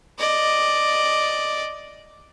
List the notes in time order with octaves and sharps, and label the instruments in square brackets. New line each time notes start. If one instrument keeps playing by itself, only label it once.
[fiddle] D5 D#5